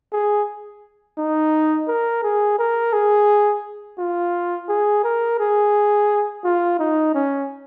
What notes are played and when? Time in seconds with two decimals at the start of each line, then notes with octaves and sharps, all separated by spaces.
0.13 G#4
1.18 D#4
1.88 A#4
2.23 G#4
2.58 A#4
2.93 G#4
3.99 F4
4.69 G#4
5.04 A#4
5.40 G#4
6.44 F4
6.79 D#4
7.14 C#4